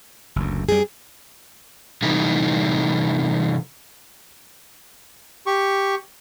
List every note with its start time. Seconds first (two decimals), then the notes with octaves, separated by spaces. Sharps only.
0.36 F#1 D2
0.69 F#2 G3 G#4
2.03 C3 E3 G3 A3 D#4
5.46 G4 C#6